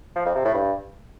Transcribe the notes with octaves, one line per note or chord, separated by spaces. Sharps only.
F3
F2
C3
A2
G2